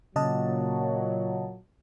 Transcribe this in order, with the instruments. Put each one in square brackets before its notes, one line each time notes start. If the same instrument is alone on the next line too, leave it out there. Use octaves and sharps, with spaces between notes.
[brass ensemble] A#2 F#3 [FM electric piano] C#3 D#5 A5